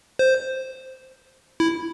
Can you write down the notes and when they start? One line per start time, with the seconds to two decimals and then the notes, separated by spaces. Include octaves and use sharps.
0.19 C5
1.60 E4